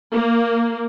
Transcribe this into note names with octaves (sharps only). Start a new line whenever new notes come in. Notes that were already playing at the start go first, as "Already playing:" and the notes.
A#3